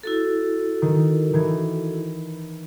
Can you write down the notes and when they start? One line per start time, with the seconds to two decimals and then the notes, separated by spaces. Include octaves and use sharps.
0.03 E4 F#4 A4
0.82 D#3
1.33 D#3 E3 G#6